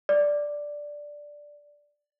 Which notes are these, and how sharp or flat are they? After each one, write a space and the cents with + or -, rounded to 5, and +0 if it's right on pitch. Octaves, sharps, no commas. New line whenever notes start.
D5 +0